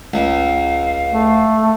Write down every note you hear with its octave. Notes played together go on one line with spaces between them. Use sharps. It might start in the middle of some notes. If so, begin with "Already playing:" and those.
C#2 F5
A3